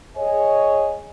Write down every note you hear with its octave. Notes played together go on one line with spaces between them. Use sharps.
G#4 C#5 D#5 G#5